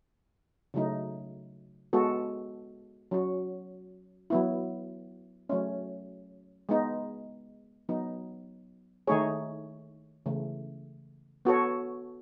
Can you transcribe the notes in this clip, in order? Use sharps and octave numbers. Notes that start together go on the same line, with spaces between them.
C#3 F#3 A3 D#4
G#3 B3 F#4 A4
F#3 C#4 F#4
F#3 B3 E4
F#3 A3 C#4
G#3 B3 D#4
F#3 B3 D#4
D#3 A3 D#4 G#4 C#5
C#3 E3 A3
B3 F#4 A4 C#5